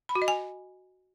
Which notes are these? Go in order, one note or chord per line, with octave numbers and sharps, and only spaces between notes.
B5
F#4
D#5
G#5